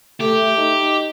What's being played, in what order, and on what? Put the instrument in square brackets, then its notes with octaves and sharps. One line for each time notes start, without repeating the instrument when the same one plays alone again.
[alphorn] A3 [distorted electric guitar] G4
[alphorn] D#4